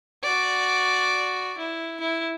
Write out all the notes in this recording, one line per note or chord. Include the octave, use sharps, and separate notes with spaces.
F#4 D5
E4
E4